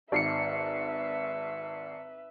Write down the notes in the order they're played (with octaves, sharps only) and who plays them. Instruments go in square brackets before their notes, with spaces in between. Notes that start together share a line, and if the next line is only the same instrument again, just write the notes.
[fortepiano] G#1 [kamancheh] B4 E5 [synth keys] D5 C7 C#7